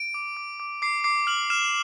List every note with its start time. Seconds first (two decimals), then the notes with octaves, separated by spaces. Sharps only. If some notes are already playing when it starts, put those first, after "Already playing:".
Already playing: D7
0.14 D6
0.37 D6
0.60 D6
0.82 D6 C7
1.04 D6 C7
1.27 F6 F#7
1.50 F6 E7